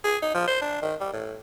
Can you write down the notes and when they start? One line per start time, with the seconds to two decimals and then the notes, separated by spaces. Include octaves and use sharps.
0.04 G#4
0.22 D#4
0.35 F3
0.48 C5
0.61 D4
0.82 D#3
1.00 G3
1.13 A2